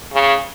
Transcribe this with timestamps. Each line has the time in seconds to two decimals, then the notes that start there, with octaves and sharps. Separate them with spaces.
0.13 C#3